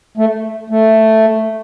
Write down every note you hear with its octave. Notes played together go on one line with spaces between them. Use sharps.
A3
A3